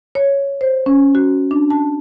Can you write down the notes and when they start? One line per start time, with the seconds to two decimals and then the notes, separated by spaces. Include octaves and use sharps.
0.15 C#5
0.61 C5
0.86 C#4
1.15 F#4
1.51 D4
1.70 A5